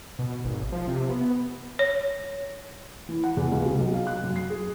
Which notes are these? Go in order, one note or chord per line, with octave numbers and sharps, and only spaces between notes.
B2
G#1
F3
C3
B3
C#5
E3
F#5
E2
C#2
C3
B1
F5
F#6
F#2
C7
G#4